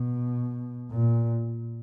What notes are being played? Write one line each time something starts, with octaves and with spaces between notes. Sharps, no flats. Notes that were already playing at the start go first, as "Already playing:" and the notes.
Already playing: B2
A#2